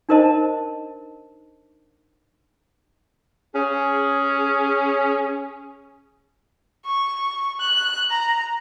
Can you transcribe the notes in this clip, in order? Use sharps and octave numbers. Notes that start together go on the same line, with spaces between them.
D4 D#4 A#4 C5 D#5 A5
C#4 G#4
C#6
F#6
A#5